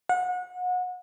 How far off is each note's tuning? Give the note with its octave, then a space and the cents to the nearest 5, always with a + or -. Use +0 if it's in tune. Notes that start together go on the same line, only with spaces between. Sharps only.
F#5 -30